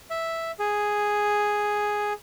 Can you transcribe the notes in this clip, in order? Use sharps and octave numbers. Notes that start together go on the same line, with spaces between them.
E5
G#4